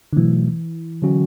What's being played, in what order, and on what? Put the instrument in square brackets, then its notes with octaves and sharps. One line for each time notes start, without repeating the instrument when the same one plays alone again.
[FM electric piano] D3
[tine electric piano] B2 F#3 A3 [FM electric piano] E3
[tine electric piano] D3 F#3 C#4 F#4